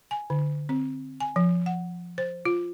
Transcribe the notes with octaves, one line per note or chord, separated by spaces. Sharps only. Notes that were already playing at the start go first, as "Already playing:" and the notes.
G#5
D3
C4
G#5
F3
F#5
C5
F4